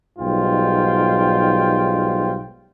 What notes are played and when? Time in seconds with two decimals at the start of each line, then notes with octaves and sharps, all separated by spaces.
0.19 B1 G#2 G3 F4 G5